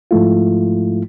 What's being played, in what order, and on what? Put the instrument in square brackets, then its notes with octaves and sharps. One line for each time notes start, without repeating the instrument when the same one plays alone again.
[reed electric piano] G#2 F3 G#3 A3 E4 F4